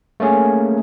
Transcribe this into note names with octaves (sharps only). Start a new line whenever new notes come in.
A3 A#3 C#4 G#4